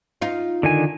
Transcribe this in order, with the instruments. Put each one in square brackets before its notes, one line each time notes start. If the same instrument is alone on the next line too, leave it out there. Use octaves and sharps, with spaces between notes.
[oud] D#4 F4
[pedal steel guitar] D3 D#3 G#5